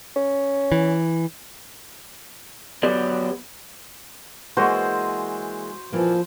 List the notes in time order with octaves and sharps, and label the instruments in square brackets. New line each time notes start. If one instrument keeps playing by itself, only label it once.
[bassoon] C#4
[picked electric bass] E3
[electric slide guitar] F#3 B3 G4 D5
[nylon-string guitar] E3 G#3 A#3 [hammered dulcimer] F#4 [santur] C5
[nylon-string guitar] A#2 E3 A#3 [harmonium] F3